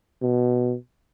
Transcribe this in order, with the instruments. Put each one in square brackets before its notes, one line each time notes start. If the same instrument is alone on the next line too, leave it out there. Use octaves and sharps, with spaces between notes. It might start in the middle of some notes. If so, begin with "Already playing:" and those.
[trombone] B2